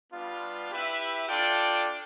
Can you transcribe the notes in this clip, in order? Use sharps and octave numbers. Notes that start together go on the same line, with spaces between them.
G3 B3 D4 F4
E4 G4 B4 E5
D4 F4 A4 D5 G5